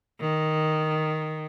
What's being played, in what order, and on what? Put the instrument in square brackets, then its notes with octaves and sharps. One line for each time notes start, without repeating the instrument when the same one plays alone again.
[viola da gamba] D#3